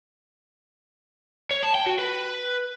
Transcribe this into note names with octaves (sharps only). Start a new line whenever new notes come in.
C#5
A5
G5
F#4
B4